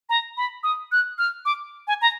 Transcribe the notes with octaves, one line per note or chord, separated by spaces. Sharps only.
A#5
B5
D#6
F#6
F6
D6
G#5
A#5